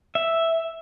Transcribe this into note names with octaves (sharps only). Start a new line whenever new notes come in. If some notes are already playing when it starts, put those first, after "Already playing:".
E5